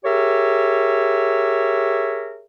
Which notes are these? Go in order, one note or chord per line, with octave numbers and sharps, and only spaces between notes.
G4 G#4 A#4 C#5 E5